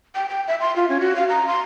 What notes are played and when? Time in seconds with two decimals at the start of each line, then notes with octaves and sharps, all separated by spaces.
0.15 G5
0.29 G5
0.48 E5
0.61 C6
0.76 F4
0.89 C#4
1.00 F#4
1.16 F5
1.29 A#5
1.47 C6